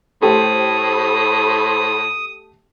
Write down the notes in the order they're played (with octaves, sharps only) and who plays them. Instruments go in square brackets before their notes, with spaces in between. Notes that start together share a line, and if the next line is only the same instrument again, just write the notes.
[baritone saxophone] A2 [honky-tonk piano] A3 G4 A4 [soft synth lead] C5 [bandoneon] D#6